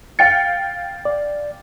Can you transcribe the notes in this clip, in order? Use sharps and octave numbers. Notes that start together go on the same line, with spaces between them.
F5 G5 A6 C#7
D5